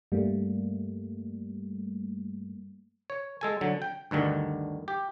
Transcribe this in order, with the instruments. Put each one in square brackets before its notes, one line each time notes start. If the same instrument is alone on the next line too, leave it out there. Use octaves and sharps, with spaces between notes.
[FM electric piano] G2 G3 A3 A#3
[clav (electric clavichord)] C#5
G#3 A4 G#5
D3 F#3
G5
D2 G2 D3 D#3
G4